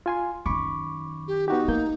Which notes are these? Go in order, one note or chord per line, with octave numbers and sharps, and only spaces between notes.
F4 G#5 C6
F#2 D#3 B5 C#6 D6
G4
B3 D#4 F#4 G4
A#3 B3 G6